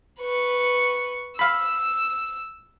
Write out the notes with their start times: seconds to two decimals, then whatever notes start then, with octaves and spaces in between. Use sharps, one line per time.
0.20 B4 C#6
1.39 F5 B5 E6